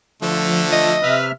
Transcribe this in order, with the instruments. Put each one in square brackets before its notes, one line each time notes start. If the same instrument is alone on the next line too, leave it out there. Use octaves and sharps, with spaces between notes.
[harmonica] D3 A3 [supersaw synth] F3
[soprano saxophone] D#5
[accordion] C3 E5 F6 [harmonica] B4